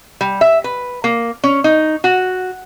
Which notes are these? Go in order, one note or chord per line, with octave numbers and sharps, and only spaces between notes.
G3
E5
B4
A#3
C#4
D#4
F#4